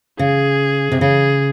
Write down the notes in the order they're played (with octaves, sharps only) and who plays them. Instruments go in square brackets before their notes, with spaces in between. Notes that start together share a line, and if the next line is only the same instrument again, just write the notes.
[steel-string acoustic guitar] C#3 [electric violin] G#4
[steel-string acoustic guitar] C3
[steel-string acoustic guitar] C#3 [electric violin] G#4